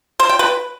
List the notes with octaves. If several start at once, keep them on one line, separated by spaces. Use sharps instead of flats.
C5
G5
B4